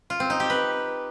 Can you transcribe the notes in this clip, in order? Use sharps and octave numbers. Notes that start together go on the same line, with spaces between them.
F4
C4
D#4
G4
B4